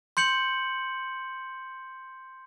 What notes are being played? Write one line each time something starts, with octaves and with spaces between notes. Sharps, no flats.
C6 G6 C#7 F#7